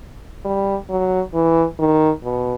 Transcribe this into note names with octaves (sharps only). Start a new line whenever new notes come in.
G3
F#3
E3
D#3
B2